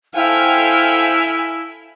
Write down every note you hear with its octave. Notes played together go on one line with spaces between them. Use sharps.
E4 A4 C5 F5 G5 G#5 F6